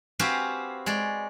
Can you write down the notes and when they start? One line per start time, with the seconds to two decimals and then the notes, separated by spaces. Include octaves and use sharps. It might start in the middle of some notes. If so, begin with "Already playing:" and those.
0.19 C4 F#4 G4 B4 F5 G#5
0.86 G#3 C#5 D5